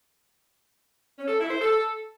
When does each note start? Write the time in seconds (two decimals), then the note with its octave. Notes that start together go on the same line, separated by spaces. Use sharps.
1.17 C#4
1.28 A4
1.39 E4
1.49 C5
1.60 A4